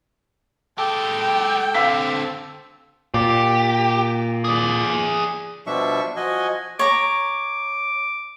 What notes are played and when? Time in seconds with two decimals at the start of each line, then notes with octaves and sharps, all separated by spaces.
0.78 G#3 G4 A4 G5 A5
1.74 D3 C4 F5 E6 B6
3.14 A#2 G4
4.44 G#4 D5
5.67 B2 F3 G3 D4 E5 C#6
6.16 F3 F#4 D#5 G#5
6.79 C#5 A#5 D6